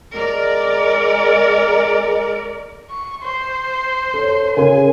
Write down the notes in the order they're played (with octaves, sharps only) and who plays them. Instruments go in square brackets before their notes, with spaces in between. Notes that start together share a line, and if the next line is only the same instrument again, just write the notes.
[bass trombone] G#3 [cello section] A#4 D5
[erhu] C#6
C5
[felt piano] A4 C#5
[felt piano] C#3 G#4 [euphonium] A#4 [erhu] G#5